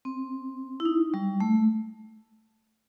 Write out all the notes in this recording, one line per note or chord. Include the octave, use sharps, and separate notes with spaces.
C4
E4
D#4
G3
A3